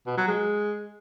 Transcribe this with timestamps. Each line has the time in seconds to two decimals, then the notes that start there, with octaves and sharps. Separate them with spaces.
0.07 B2
0.17 F#3
0.28 G#3